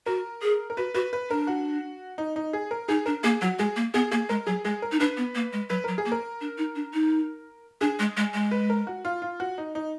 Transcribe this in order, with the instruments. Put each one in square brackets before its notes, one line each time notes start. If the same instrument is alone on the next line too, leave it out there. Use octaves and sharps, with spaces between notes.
[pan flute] F#4 [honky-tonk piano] A#4
[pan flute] G#4
[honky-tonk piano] A#4
[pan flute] F#4 [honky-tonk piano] B4
[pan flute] F#4 [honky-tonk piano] B4
[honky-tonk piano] B4
[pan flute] D4 [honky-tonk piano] A#4
[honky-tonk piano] F#4
D#4
D#4
G#4
A#4
[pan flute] D#4 [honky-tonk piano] G#4
[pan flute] D4 [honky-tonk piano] A#4
[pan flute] A#3 [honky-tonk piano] G#4
[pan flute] F#3 [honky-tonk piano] F#4
[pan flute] G#3 [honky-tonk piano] G#4
[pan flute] A#3
[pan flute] B3 [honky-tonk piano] G#4
[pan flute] A#3 [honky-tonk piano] G#4
[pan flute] G#3 [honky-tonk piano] A#4
[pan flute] F#3 [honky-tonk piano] G#4
[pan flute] G#3 [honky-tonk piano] G#4
[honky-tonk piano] A#4
[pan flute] D#4
[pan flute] D4 [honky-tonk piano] B4
[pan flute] B3
A#3
G#3
[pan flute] F#3 [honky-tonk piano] B4
[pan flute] F#3 [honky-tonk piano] A#4
[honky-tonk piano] G#4
[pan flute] A#3
[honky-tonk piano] A#4
[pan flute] D4
D#4
D4
D#4
[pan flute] D4 [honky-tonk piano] G#4
[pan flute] G#3
G#3
G#3
[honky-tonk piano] B4
A#4
F#4
F4
F4
F#4
D#4
D#4